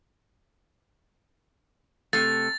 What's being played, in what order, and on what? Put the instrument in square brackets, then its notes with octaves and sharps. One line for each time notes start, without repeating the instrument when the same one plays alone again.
[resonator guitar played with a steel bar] C3 A3 [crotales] A6